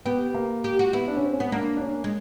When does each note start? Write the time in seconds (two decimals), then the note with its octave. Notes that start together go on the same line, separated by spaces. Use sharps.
0.05 B3 G4
0.34 A#3
0.64 G4
0.79 F#4
0.93 B3 E4
1.08 D4
1.17 C#4
1.25 C4
1.33 C#4
1.40 B3
1.52 A#3 D4
1.77 D4
1.81 C#4
2.04 G#3